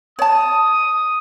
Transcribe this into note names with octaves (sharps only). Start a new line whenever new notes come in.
C#5 A5 D#6